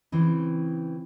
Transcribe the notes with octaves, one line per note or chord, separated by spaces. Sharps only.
C#3 E3 C4